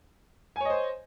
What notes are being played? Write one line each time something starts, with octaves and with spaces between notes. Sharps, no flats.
C5 C#5 D#5 G#5